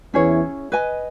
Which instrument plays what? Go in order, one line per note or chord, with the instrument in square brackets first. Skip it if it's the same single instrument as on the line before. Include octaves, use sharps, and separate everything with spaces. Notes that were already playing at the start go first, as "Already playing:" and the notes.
[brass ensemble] E2 E3 [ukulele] C#4 E4 G#4 C#5
[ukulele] B4 D#5 G#5